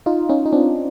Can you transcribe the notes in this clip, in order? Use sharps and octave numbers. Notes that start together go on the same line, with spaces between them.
D#4 F4
C#4 D#4
D#4
C4 D4